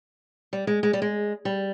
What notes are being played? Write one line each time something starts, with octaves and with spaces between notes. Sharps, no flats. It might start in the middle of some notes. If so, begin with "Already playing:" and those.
G3
G#3
G#3
G3
G#3
G3